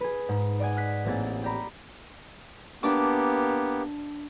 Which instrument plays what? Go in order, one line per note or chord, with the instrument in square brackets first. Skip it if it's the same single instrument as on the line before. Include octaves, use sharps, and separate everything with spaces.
[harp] G#4 B4
G#2
D5 D#5 F#5 G#5
F#6 B6
A1 A#3 C4 G#4 A6
G4 D5 A#5 B5
[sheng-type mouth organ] A#3 B3 G4 [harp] D4 D6